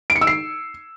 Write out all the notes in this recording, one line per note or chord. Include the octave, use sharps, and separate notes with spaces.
D7
C#7
E6
C7